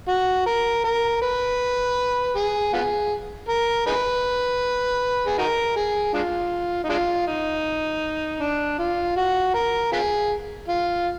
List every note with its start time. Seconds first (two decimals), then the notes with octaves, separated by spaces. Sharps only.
0.08 F#4
0.46 A#4
0.84 A#4
1.22 B4
2.36 G#4
2.73 B3 F4 G#4
3.49 A#4
3.87 D#4 G#4 B4
5.27 G#4
5.38 D#4 F#4 A#4
5.76 G#4
6.14 G#3 D4 F4
6.84 D#4
6.89 G#3 D4 F4
7.27 D#4
8.41 D4
8.79 F4
9.16 F#4
9.54 A#4
9.92 B3 F4 G#4
10.68 F4